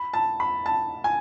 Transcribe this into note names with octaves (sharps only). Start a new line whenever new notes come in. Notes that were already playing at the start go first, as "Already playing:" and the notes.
Already playing: B5
A5
B5
A5
G#5